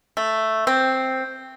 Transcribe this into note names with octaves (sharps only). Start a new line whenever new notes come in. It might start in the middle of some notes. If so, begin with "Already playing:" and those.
A3
C4